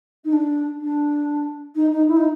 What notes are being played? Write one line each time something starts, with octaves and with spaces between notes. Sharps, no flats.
D#4
D4
D4
D#4
D#4
E4
D#4